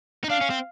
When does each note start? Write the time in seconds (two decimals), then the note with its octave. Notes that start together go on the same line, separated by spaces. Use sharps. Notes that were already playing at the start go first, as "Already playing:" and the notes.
0.24 D#4
0.30 D4 F5
0.41 C#4
0.50 C4